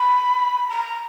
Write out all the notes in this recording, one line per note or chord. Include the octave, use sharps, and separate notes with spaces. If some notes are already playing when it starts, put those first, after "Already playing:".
Already playing: B5
A#5